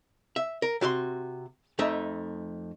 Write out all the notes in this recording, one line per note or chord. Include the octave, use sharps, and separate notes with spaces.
E5
A#4
C3 F#4 D#5 C6
F2 A3 D#4 E5